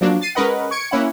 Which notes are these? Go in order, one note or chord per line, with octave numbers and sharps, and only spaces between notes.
F3 F#3 A#3 D4 F#4
A6 C7 D#7
G#3 C#4 A#4 B4 D#5 F#5
C#6 G#6 C#7 D7
A#3 C#4 E4 F#5